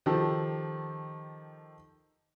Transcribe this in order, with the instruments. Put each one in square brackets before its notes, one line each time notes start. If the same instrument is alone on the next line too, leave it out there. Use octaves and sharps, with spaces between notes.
[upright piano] D#3 F3 G4 A4